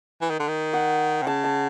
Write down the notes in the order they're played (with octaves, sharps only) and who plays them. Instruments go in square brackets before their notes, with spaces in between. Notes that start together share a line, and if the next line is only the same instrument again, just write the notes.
[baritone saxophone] E3
D#3
D3
D#3
[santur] F#5
[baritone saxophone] C3
[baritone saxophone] C#3 [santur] A5
[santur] A5